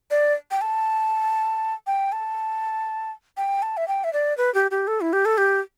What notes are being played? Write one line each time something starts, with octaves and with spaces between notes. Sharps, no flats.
D5
G5
A5
G5
A5
G5
A5
E5
G5
E5
D5
B4
G4
G4
A4
E4
G4
A4
G4